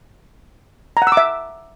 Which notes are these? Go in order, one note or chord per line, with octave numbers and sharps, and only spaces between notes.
A#5
F#5
E6
D6
E5